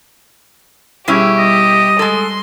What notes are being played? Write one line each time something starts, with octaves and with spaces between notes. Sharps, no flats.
B2 G3 C#4 E4 G4 G#4
G3 D#5
G#3 A4 C6